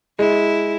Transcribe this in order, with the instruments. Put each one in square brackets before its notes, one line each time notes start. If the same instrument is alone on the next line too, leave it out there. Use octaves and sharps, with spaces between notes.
[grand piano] G#3 [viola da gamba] E4